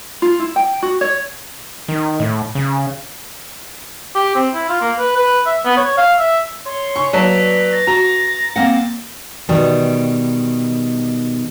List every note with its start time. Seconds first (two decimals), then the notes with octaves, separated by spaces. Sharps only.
0.22 F4
0.39 E4
0.56 G5
0.83 F#4
1.01 C#5
1.88 D#3
2.20 A2
2.55 C#3
4.15 G4
4.35 C4
4.54 E4
4.69 F4
4.81 A#3
4.99 B4
5.16 B4
5.46 E5
5.65 B3
5.77 C#5
5.97 F5
6.19 E5
6.65 C#5 C6
6.96 C#3 C#6
7.13 F#3 A#3 B4 D5 A5 B6
7.72 A6 A#6
7.87 F#4 A#5
8.56 A#3 C4 F#5
9.49 B2 D#3 G3